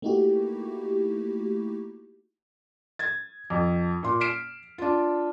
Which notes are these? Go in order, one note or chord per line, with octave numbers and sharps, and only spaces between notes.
A3 A#3 D#4 E4 F#4 G4
G#6 A6
F2
A#2 C6
F6 B6 C7 D7 E7
D4 F4